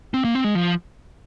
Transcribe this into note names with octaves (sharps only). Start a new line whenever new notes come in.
C4
A#3
C4
G#3
F3